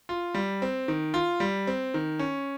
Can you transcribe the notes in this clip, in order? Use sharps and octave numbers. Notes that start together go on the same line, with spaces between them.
F4
G3
C4
D#3
F4
G3
C4
D#3
C#4